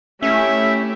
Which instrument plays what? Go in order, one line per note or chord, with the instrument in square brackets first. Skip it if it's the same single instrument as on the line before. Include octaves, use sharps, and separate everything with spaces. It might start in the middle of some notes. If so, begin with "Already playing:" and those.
[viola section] A3 E4 G4 [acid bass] C#4 [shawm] E5